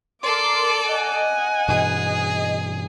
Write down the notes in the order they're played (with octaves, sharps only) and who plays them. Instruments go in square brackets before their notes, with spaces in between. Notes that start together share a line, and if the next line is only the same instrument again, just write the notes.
[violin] A4 D5 [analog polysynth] A#4 C6 [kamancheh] D6
[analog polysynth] D#5 [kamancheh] F#5 G#5
[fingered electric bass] G2 B2 E3 [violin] G#4